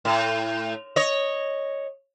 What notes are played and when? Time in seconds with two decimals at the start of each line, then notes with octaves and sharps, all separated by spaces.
0.05 A2
0.96 C#5 D#5